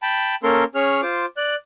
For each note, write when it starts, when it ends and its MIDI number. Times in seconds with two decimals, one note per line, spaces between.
0.02 0.35 79
0.02 0.35 81
0.02 0.35 83
0.43 0.64 58
0.43 0.64 61
0.43 0.64 69
0.43 0.64 70
0.43 0.64 84
0.75 1.01 61
0.75 1.01 68
0.75 1.01 73
0.75 1.01 89
1.02 1.26 65
1.02 1.26 72
1.02 1.26 86
1.37 1.55 74
1.37 1.55 90